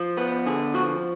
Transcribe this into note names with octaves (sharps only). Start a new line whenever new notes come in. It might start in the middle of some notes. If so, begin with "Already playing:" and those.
Already playing: F3
B3 B4
D3 G#4
F3 F#4